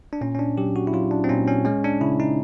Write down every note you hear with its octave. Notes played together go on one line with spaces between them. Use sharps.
D4
A#2 C#4
C#4
D4
F#3 G4
F#4
E4
F#3 F4
D4
C4
A#2 C#4
C#4
G#3 C#4
D4
C#3 E4
D#4